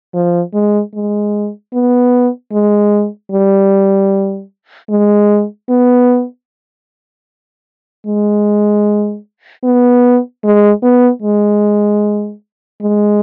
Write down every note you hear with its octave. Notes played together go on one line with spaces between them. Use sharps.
F3
G#3
G#3
B3
G#3
G3
G#3
B3
G#3
B3
G#3
B3
G#3
G#3